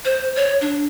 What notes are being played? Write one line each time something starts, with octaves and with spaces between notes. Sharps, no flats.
C5
C#5
D4